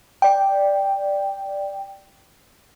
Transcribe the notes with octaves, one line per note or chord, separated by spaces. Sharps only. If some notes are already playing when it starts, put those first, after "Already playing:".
D5 G5